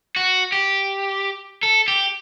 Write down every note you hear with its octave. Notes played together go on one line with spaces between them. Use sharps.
F#4
G4
A4
G4